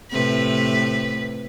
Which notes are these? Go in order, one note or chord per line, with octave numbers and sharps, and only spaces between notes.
A2 C3 B4